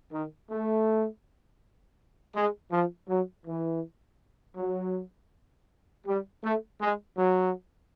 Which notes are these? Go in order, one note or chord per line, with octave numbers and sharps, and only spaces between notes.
D#3
A3
G#3
F3
F#3
E3
F#3
G3
A3
G#3
F#3